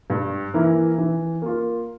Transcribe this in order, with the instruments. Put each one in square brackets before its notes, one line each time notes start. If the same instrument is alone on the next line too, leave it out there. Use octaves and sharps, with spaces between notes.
[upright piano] G2
E3 A#3 E4 A#4
E3
A#3 F4